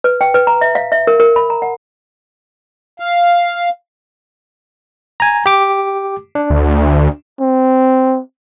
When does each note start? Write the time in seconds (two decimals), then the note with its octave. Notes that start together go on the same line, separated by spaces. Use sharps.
0.04 B4
0.21 G5
0.34 B4
0.47 A#5
0.61 E5
0.75 F5
0.92 E5
1.07 A#4
1.20 A#4
1.36 B5
1.50 A#5
1.62 F#5
3.00 F5
5.20 G#5 A#5
5.46 G4 D6
6.35 D4
6.50 D2
7.40 C4